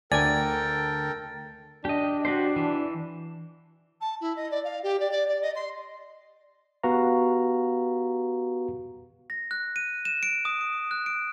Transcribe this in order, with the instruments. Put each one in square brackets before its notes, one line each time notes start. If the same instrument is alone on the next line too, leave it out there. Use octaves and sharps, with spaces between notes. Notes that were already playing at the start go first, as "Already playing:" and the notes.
[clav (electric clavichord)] D2 [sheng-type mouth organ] A4 A#4 G5 [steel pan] D5 G#5 [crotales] A6
[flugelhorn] D4 [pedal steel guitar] G4 D#5
[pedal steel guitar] F#4 G4 C5
E3
[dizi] A5
E4
D#5
D5
F5
G4
D5
D5
D5
D#5
C6
[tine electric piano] B3 F#4 G4 B4 F5 A#5
[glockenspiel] A#6
F#6
D#7
E7
D7
D#6
D7
F#6
D7